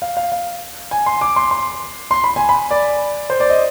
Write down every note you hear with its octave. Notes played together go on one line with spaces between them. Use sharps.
F5
F5
F5
G#5
C6
D6
C6
C6
C6
B5
G#5
B5
D5
C5
D5
D#5